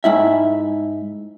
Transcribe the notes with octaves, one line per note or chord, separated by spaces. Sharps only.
G#2 E4 E5